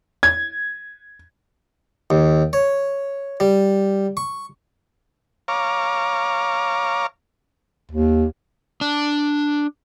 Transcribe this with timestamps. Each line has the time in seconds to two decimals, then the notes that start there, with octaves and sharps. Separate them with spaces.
0.23 G#6
2.10 D#2
2.53 C#5
3.40 G3
4.17 C#6
5.48 C#5 F5 A#5 D6
7.91 D#2
8.81 D4